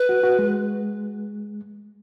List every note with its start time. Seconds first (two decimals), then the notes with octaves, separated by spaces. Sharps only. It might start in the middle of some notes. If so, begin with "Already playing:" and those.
Already playing: B4
0.09 F#4
0.23 F#4
0.39 G#3